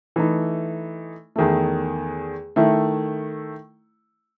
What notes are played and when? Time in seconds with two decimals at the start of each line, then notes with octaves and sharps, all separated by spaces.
0.16 E3 A3 D#4
1.36 E2 D#3 A3
2.56 D#3 A3 E4